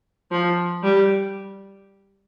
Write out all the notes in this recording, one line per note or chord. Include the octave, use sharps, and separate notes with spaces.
F3
G3